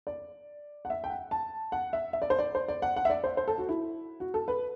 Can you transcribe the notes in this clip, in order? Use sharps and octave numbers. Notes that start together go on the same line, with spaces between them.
D5
F#5
E5
G5
F#5
A5
F#5
E5
E5
D5
C5
D5
C5
D5
F#5
F#5
E5
D5
C5
C5
A4
F#4
E4
F#4
A4
B4